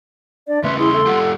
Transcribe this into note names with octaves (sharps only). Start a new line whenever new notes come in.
D4 D5
C#3 A3 C#4 B4 E5 C6
E4 G#4 C6
A4 E5
G3 F4 G4 F#5